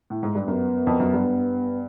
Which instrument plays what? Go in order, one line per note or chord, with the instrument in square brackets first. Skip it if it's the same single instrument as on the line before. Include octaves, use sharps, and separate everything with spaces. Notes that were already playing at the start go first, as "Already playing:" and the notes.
[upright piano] A2
G#2
G2
[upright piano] F#2 [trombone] B3
[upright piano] F2
F#2
G2